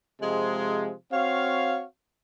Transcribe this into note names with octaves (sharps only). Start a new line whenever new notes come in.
C3 F3 G#3
C4 F#4 C#5 F5